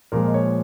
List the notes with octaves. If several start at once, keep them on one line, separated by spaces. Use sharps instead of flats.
A#2 F3 G#3 A#4
D#5
C#5